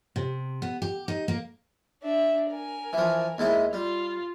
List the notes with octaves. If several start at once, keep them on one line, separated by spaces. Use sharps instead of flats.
C3
B3
G4
D#4
A#3
D4 E5
A#4 G#5
E3 F3
D#2 G#3 E4
G3 F4